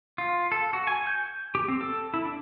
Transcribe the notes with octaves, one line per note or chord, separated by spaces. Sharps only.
F4
A4
F#4
G#5
G6
G4
C4
A4
E4
D4